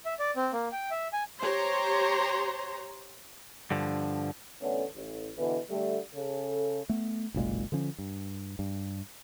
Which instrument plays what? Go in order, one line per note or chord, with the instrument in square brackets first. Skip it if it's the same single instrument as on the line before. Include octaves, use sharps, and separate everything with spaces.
[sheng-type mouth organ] E5
D5
C4
A#3
G5
E5
G#5
[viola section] G4 C5 C#5 A#5 C6
[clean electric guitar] G2 D3 F3
[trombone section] A1 D3 A3 B3 C#4 A4
A1
B2 D3 E3
D3 G3 A3
C#3 A4
[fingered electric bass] A3 B3
F#1 B1 A#2 G#3
D3 F3 C#4
G2
G2